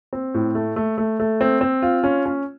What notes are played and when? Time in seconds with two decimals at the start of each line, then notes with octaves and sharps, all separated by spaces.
0.13 C4
0.34 A2
0.55 A3
0.76 A3
0.98 A3
1.20 A3
1.41 C4
1.61 C4
1.82 F4
2.04 C#4
2.26 C#4